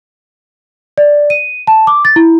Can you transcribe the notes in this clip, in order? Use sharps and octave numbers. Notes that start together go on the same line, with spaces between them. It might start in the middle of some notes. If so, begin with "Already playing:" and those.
D5
D#7
A5
D6
A6
E4